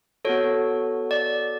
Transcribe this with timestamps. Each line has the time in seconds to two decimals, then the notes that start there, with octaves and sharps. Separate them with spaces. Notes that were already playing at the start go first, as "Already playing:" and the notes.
0.25 B3 F#4 A4 C#5
1.11 D5